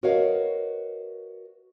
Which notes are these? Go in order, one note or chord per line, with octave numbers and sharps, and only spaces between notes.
F#4 A#4 B4 C#5 D#5 F5